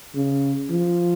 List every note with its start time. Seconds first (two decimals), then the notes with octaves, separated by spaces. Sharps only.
0.15 C#3
0.70 F3